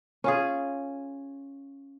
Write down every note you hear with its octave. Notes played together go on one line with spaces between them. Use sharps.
C#4 F4 G#4